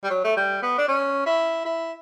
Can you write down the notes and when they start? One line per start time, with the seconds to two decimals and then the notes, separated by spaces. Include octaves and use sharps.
0.04 G3
0.10 F#3
0.24 A3
0.37 G3
0.63 B3
0.78 D4
0.88 C#4
1.26 E4
1.65 E4